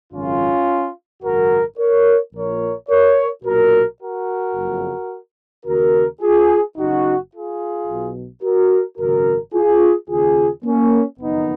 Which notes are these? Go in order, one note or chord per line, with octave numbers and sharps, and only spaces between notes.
G#1 F#2 C#3 C#4 F4
G#1 F#2 C#3 F#4 A#4
A#4 C#5
A#1 A#2 A#4 C#5
A#4 C#5
B1 A#2 F#4 A#4
F#4 A#4
F#1 F2 C#3
D#2 C#3 F#4 A#4
F4 G#4
F#1 F#2 C#3 D#4 F#4
F4 G#4
B1 B2
F#4 A#4
G#1 F#2 C#3 F#4 A#4
F4 G#4
D#2 C#3 F4 G#4
A#3 C#4
F#1 F2 D#3 B3 D#4